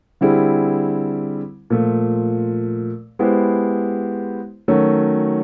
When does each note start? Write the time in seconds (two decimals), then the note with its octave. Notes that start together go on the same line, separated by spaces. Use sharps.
0.21 D3 G3 C4 E4 G#4
1.70 A#2 F3 A3
3.19 G#3 B3 E4 G4 C5
4.68 D#3 F#3 A3 C#4 F#4